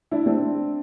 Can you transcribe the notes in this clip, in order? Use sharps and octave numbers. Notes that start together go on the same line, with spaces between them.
D4 E4
C4 D4